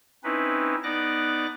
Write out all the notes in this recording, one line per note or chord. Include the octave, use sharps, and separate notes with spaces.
C4 C#4 D#4 E4 B4
B3 D#4 D5 D6 F#6 A#6